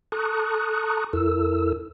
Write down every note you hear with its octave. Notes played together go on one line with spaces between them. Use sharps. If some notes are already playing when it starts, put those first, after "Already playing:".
A4 A5 A#5 C#6 D#6 F#6
F2 E4 A4 A#4 E6